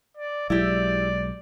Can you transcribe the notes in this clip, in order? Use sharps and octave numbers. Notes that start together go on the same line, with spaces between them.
D5
B1 F#3 G#3 E4 G4 D5